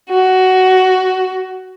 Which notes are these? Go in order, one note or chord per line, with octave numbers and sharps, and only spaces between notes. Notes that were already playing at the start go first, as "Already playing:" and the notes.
F#4